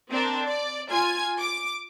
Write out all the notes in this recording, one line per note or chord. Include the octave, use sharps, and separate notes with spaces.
C4 D4 A#4
D5
F4 G#5 G#6
D6